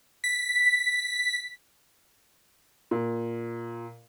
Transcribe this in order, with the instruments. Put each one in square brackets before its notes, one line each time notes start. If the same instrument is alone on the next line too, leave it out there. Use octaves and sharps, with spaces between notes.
[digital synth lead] B6
[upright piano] A#2